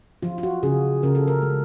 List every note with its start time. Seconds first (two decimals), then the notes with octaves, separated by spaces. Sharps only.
0.23 F3 F4
0.38 F4
0.43 F#4
0.63 C#3 G#4
1.03 C#3 A#4
1.15 A4
1.28 A#4
1.42 G#3